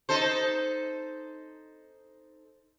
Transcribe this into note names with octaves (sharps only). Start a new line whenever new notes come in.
D#4 A4 C5